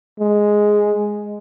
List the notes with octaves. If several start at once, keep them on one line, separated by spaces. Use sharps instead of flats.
G#3